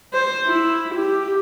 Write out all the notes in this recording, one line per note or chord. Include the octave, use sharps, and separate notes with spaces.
C5
E4
G4